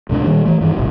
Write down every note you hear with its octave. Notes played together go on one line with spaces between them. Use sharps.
C#2 A2 C3 D4
A#2 D#3 G3
E3 A3
G2 D#3 E3
D#1 G#1 C3